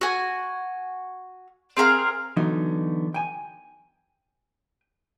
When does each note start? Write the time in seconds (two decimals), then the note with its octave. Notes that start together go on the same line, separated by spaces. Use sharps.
0.01 F#4 G#5
1.77 C4 G#4 A#4 F5
2.37 D3 E3 F#3 B3 D#4
3.14 G5 G#5